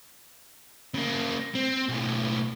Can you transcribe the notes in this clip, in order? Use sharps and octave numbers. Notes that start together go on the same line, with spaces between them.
C#3 A#3
C4
B1 A2